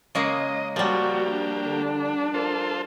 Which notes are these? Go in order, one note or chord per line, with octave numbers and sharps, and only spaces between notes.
C#3 G#3 A#3 D#5
F3 G3 A#3 F#4 G4
D4
D3
F4 A4 A#4 C5